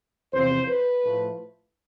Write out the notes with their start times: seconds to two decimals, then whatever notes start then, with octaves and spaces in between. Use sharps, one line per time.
0.33 E2 C3 F3 C5
0.68 B4
1.03 A2 F3 A3